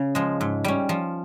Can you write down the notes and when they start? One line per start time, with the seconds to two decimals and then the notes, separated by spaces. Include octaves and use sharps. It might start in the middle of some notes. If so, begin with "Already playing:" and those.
Already playing: C#3
0.15 F3 G#3
0.41 G#2
0.64 G3 C#4
0.89 F3